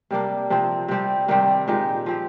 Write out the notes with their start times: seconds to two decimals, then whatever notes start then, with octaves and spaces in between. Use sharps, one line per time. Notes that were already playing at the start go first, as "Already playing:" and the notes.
0.11 C3 G3 A#3 D4
0.50 C3 F3 C4
0.88 C3 G3 C4 G4
1.28 C3 D#3 G3 C4
1.67 A#2 G#3 D#4 G4
2.06 F3 C4 G4